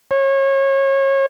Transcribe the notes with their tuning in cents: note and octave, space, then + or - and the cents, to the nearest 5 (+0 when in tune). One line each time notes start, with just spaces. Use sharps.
C#5 -30